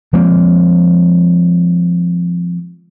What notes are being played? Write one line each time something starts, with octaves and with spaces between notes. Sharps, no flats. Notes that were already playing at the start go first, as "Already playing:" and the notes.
F3 G#3 A#3 C4